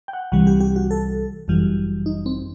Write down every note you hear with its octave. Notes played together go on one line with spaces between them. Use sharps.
G5
F#5
C2 C3 E3 G3 F#5
G4
G4
F#4
A4
G1 F#2 E3 G3
D#4
C4